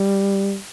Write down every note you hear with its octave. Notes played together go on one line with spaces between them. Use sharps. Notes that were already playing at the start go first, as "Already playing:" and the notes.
Already playing: G3